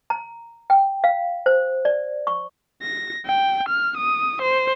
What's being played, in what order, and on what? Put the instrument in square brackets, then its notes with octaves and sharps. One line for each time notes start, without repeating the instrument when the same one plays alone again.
[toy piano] A#5
G5
F5
C5
D5
C#6
[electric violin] A#6
G5
F6
D#6
C5